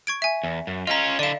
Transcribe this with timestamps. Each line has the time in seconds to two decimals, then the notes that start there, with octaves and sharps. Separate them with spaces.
0.07 C#6 G#6 D7
0.22 E5 G#5
0.43 E2
0.67 F#2
0.87 C#4 F4 D#5 A#5
1.19 D3 E4 D5 F5